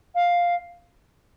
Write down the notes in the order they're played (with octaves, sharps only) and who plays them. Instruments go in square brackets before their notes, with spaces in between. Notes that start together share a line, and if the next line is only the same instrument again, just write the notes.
[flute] F5